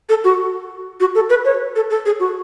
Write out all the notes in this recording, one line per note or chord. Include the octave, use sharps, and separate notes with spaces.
A4
F#4
F#4
A4
B4
C#5
A4
A4
G#4
F#4